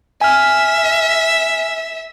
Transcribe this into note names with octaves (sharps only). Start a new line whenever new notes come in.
E5 G#5 F6